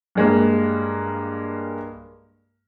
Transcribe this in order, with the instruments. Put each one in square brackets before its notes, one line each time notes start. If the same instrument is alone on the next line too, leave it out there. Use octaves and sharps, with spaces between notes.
[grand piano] G2 G#3 A#3